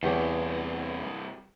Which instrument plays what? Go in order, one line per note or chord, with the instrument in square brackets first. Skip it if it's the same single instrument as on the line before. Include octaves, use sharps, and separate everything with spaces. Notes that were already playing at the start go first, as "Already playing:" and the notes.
[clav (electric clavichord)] E2 G4 C#5 [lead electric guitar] G2 C3